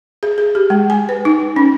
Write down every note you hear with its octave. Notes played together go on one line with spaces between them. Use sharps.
G#4
G#4
G4
G#3
G#5
B4
D#4
C#4